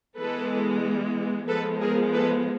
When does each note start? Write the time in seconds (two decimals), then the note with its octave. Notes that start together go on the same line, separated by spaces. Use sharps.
0.17 E3 G#3 B3 A4 B4
1.48 F3 G#3 B3 A4 B4
1.81 G#4 A#4
2.14 A4 B4